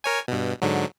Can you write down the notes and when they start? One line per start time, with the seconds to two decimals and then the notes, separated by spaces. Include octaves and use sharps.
0.04 A#4 C#5 G#5
0.28 G2 B2
0.62 G#2 D3 F#3